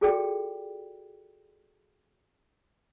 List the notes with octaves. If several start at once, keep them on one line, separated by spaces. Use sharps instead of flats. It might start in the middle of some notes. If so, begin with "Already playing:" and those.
F4 F#4 G#4 A4 D5 G5